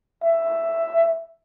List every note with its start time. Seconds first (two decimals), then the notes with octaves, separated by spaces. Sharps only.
0.23 E5